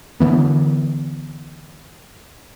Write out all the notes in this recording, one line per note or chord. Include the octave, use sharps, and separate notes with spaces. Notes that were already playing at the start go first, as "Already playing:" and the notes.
D3 E3 B3